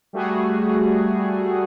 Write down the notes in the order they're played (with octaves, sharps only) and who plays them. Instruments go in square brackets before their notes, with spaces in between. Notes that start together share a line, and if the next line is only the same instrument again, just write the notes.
[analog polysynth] G3 A3 F#4 G#4